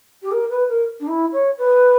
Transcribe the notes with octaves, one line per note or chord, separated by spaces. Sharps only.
G4
A#4
B4
A#4
D4
E4
C#5
B4